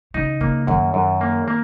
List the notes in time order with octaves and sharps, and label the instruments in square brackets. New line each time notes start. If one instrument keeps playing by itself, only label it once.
[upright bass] C#3 [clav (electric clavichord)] D#4
[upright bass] C#3 [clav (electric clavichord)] A#3
[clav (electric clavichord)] F#2 [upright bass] D#3
[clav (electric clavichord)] F#2
A#3
A#3